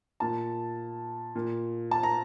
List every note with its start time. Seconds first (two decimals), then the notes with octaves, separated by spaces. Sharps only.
0.20 A#2 A5
1.35 A#2
1.91 A5
2.03 A#5